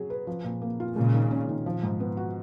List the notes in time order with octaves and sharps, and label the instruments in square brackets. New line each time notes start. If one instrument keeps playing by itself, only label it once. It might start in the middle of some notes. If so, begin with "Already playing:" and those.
Already playing: [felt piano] F#3 G#4
B4
F3
A#2
A#3
F4
[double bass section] A#2 C#3 [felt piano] G#3
[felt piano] D#3
C#4
D#3
F3
G#2
B3
F#4